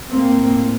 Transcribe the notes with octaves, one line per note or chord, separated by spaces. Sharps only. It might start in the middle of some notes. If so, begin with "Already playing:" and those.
A2 A#3 C4